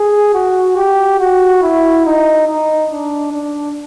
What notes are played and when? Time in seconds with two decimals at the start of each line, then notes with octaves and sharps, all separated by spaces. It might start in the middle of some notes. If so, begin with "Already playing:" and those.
Already playing: G#4
0.34 F#4
0.77 G4
1.19 F#4
1.62 E4
2.05 D#4
2.47 D#4
2.91 D4
3.33 D4